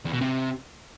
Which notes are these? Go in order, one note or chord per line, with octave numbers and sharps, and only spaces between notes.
E2
B2
C3